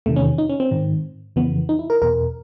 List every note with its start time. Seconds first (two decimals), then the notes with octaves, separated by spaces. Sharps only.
0.06 E2 C3 D#3 A3
0.16 C#4
0.38 D#4
0.49 C#4
0.60 C4
0.71 G#2 D#3
1.36 F2 C#3 E3 B3
1.69 D#4
1.79 E4
1.90 A#4
2.02 E2 B2 A#4